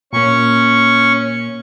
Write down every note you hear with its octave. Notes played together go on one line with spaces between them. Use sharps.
A#2 A#3 C#4 C#6